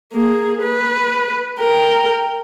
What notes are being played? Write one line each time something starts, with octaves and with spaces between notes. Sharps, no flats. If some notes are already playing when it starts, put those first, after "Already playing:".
A#3 G#4
B4
A#4 G5